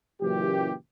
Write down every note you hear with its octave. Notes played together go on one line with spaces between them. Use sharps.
F#1 F#2 A#2 E3 G4